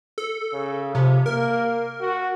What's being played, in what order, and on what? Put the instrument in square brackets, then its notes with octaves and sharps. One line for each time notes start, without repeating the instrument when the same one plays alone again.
[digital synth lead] A4
[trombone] C#3
[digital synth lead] C3 [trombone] F3
[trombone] A#3 [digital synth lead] A#4
[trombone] F#4